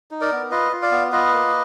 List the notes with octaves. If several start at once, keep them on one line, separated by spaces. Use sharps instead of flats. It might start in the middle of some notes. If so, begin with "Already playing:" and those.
D#4
A#4 D5
B3
F4 B4 D#5
F4
D5 F5
B3
F4 B4 D#5
A#3